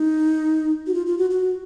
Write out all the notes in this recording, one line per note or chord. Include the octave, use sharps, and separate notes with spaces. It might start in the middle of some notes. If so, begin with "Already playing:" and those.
Already playing: D#4
F#4
F4
F4
F#4
F#4